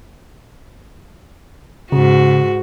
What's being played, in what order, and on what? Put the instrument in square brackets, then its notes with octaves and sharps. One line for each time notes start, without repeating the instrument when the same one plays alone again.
[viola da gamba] G#2 F#4 [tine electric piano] C#3